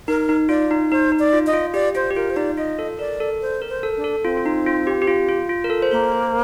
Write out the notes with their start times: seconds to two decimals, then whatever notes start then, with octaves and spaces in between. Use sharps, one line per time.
0.08 D#4 A#4
0.29 D#4
0.49 F4 D5
0.71 D#4
0.91 D#4 C5
1.12 D#4
1.19 D5
1.33 F4
1.47 D#5
1.53 F4
1.74 G4 D5
1.95 F4 C5
2.11 G4
2.16 F4 A#4
2.30 C5
2.36 D#4 D5
2.57 F4 D#5
2.79 A4
2.99 A#4 D5
3.20 A4
3.41 C5
3.62 A#4
3.69 C5
3.83 A4
3.97 D4
4.04 A4
4.24 C4 F4
4.37 F4
4.46 D#4
4.66 F4
4.87 G4
5.02 G4
5.07 F4
5.29 F4
5.49 F4
5.64 A#4
5.70 A4
5.82 C5
5.91 A#3 A#4
6.12 C5